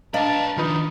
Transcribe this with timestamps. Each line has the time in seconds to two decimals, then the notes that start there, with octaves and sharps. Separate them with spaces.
0.14 D4 B4 D#5 F5 A5 A#5
0.57 D#3 F3 D#4 F4 B4